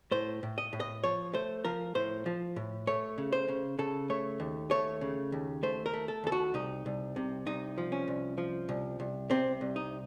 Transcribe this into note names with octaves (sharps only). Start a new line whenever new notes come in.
A2 C5
A2
D#5
A2
D#5
F3 C#5
A3 C5
F3 A#4
A2 C5
F3
A2
A3 C#5
C#3
C5
C#3
C#3 A4
A3 C#5
D#2
A3 C#5
C#3
D#2
A3 C5
A#4
A3
A4
D#2 A4
F#4
C2 D#4
C2
C3
C2 D#4
F3
C#4
C2
F3
C2
C2
C3 C4
C2
D#4